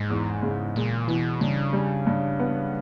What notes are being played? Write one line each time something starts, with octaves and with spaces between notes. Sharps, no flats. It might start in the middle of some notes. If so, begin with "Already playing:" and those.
Already playing: G#2 G#3
E2
C#3
A#2 G#3
B2 E3
G2 C#3
G3
G2
B3